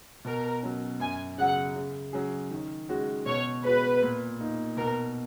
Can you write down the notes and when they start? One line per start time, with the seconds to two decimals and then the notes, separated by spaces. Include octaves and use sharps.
0.25 B2 A#4
0.63 F#3 C#4
1.00 F#2 G#5
1.38 C#3 F#3 F#5
1.76 C#3
2.13 F#3 C#4 G#4
2.51 D#3
2.89 G#3 C#4 F#4
3.26 B2 C#5
3.64 G#3 B3 F#4 B4
4.02 A#2
4.40 A#3 D#4
4.77 B2 A#4